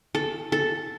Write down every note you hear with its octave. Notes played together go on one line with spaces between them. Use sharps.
A4
A4